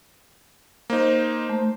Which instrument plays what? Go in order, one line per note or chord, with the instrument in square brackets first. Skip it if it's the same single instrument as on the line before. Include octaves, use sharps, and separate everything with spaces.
[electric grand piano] A#3 D#4 [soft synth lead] C5
[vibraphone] A3